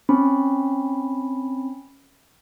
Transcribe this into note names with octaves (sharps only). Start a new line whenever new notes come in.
C4 C#4 B5